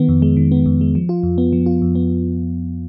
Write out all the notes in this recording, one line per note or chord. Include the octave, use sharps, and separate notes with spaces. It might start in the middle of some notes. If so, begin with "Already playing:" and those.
Already playing: D#3 B3
F2
G#3
D#3
B3
F2
G#3
F3
F4
F2
B3
F3
F4
F2
B3